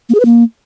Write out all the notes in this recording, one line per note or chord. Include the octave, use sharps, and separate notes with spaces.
A#3
G#4
B4
A#3